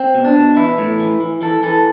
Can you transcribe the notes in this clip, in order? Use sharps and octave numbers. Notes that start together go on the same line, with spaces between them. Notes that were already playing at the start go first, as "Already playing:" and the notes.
Already playing: C4
B2
D4
B2
E3 E4
A2
E3
E3
E3 A4
E3 A4